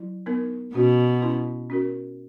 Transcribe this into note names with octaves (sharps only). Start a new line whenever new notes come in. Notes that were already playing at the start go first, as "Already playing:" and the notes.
Already playing: F#3 E4
B3 D#4 A#4
B2 C#4 F#4 B4
C#4 E4 B4
C#4 F#4 A#4